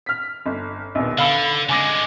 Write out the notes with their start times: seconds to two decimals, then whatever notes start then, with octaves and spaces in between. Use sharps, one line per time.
0.06 F6 B6
0.46 G1
0.95 A#1 D#2 B2
1.18 D3 F5 B5 E6
1.69 D3 G#3 G#5 D6 A#6